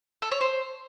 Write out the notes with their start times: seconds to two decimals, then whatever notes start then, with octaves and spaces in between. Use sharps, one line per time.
0.22 A4
0.31 C#5
0.41 C5